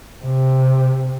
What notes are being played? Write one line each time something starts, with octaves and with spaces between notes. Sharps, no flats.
C3